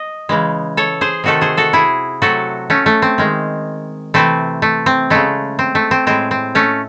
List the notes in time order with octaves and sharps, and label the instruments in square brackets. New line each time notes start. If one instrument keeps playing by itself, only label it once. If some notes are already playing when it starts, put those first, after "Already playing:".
Already playing: [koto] D#5
C#3 E3 G#3
A4 C#5
G#4 C5
C3 D#3 A3 F#4 A4
G#4 C5
F#4 A4
E4 G#4
C3 F#3 A3 F#4 A4
A3 C#4
A3
C4
D#3 G#3
C3 E3 A3 C4
A3
C4
C#3 G#3 A3
C4
A3
C4
A2 G#3 C4
C4
A3 C#4